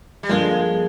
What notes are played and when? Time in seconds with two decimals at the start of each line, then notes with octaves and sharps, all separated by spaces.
0.23 G3
0.29 G2 D3 F3 G#3 A#3 F4